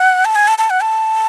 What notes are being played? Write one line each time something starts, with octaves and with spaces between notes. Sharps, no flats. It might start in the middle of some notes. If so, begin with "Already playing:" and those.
Already playing: F#5
A5
G#5
A5
A5
F#5
A5